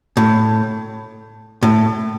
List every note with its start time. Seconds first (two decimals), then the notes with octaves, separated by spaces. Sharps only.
0.17 A2
1.63 A2